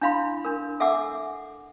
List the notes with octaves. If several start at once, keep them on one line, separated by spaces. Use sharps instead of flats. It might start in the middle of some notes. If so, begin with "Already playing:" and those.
D4 E4 F5 B5 C6
D4 A#4
A4 E5 F#5 G#5 D6 E6